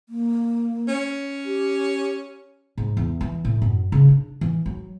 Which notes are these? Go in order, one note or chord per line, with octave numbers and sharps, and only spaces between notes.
A#3
C#4
G4
G#2
E2
E3
A2
F#2
C#3
D4
E3
F#3